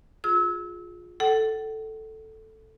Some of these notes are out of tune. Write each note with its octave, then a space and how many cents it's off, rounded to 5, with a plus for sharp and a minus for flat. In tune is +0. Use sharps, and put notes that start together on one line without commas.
F4 +20 G#4 +0 E6 -30
A4 +0 F#5 +40